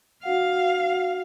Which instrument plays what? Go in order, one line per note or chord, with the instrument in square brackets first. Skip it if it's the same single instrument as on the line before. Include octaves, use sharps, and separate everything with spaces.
[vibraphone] D4 F#4 F#5 [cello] F5